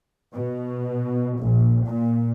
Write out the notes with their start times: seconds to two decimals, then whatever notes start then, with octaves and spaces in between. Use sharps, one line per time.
0.33 B2
1.38 A#1
1.84 A#2